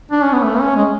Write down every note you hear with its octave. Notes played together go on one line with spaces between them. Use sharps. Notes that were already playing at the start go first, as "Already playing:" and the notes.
D4
C#4
B3
A3
C#4
G#3